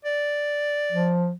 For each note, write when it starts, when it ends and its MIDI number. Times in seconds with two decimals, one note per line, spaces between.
0.05 1.12 74
0.92 1.32 53